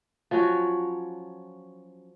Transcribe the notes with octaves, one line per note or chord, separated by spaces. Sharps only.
F3 F#3 C#4 F#4